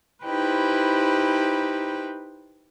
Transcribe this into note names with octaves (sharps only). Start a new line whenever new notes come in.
D#4 E4 G4 B4 C5 G5